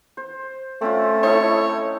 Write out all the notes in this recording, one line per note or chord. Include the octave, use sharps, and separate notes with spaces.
C5
A3 C4 C#4 F4
D#4 E4 A4 C#5